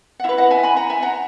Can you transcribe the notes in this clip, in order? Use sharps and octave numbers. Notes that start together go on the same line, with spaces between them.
F#5
E4 B4 C#5 E5
D#5 F#5
E5 G#5
G#5 B5
F#5 A#5
E5 G#5
F#5 A#5